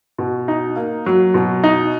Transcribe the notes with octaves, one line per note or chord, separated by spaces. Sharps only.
B2
D#4
A#3
F#3
B2
D#4